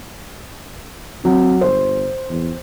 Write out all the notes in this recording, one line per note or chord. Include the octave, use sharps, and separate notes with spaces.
F#3 C4
G1 C5
E2